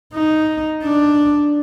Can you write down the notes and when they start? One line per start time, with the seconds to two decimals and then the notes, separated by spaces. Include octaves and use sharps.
0.15 D#4
0.83 D4